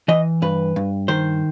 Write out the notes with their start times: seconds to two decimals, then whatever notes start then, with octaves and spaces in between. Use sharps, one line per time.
0.08 E3 D#5
0.42 G2 B4
0.76 G2
1.08 D#3 C5